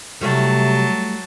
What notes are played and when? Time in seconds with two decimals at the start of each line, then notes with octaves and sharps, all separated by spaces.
0.21 C3 F#3 G3 A3 E4 A5